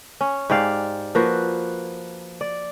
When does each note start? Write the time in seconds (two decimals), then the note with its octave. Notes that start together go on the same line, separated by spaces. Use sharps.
0.21 C#4
0.50 G#2 G4 D5 F5
1.15 F3 A#3 F#4 B4
2.41 D5